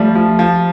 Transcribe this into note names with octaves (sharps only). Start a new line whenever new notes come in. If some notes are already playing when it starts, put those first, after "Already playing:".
Already playing: F3 G3 A3
F3
F3